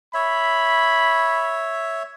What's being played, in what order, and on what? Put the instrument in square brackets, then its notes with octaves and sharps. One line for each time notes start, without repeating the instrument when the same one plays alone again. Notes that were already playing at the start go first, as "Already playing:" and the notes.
[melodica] C#5 E5 [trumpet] B5